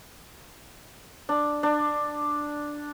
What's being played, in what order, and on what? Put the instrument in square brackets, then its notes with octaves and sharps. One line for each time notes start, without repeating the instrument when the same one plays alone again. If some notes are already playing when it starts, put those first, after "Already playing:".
[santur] D4
D4